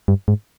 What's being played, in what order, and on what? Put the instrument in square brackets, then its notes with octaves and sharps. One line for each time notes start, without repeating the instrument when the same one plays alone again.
[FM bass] G2
G#2